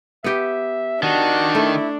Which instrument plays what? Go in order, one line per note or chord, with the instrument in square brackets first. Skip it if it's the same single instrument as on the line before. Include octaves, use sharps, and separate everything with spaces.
[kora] B3 G4 [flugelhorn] E5
[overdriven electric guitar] D#3 [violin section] D4 [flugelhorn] F#4
[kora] A3 [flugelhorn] E4